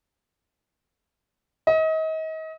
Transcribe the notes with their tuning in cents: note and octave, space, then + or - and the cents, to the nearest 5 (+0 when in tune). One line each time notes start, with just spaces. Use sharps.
D#5 +35